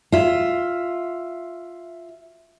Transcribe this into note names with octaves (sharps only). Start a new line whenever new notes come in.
F4 E5